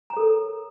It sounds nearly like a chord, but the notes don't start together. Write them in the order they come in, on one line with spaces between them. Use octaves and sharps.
A#5 C#5 A4 A#4